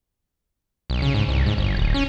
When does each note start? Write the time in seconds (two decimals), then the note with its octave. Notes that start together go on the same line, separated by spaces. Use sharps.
0.90 B1
1.02 C#3
1.14 G#2
1.28 C2
1.46 G#2
1.58 G1
1.77 D1
1.94 C#4